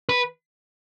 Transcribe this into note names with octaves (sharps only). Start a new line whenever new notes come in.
B4